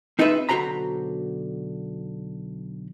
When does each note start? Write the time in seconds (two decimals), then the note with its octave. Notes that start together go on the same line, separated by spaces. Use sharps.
0.19 C4 D#4 F4 G#4 B4 E5
0.49 B1 D3 F#4 C5 A#5 B5